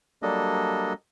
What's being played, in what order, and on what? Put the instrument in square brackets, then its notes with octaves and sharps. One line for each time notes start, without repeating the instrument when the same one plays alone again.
[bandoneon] F#3 G3 A#3 D4 A4 D#5